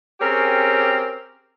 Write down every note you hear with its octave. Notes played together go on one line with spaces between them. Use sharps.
C4 C#4 G4 G#4 A#4